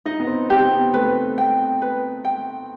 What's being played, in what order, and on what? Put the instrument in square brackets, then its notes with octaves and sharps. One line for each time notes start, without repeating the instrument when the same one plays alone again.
[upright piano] D#4 [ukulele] D#5
[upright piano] B3
C4
[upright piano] C4 [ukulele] G4
[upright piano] B3
[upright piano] A3 [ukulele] B4
[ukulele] G5
B4
G5